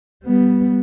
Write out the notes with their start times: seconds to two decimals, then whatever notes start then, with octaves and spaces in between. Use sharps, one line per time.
0.24 G3 B3